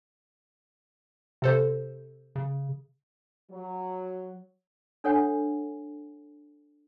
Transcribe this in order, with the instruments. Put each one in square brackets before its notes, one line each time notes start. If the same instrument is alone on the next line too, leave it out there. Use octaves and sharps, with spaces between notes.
[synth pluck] C3 A4 C5
[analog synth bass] C#3
[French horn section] F#3
[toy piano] D4 A4 C#5 F#5 G#5